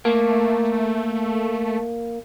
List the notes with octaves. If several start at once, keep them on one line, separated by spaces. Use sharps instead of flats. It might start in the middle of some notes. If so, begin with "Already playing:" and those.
A3 A#3